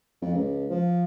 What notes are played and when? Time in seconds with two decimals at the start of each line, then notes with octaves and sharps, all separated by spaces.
0.22 F2
0.34 C#2
0.70 F3